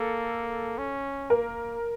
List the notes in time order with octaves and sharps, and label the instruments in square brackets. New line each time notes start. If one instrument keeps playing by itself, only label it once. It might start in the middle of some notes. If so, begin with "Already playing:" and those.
Already playing: [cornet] A#3 [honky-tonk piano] A4
[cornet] C#4
[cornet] A#3 [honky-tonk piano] A#4